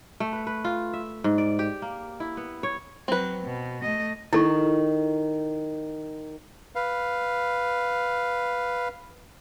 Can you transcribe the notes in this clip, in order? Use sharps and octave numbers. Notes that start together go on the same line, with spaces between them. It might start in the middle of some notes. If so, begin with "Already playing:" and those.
A3
B4
B4
F4
E5
G#2
D5
G4
A#3
E4
B3
C#5
F#3 C4 B4
B2
A3 D#5
D#3 E4 A4 C#6
B4 F5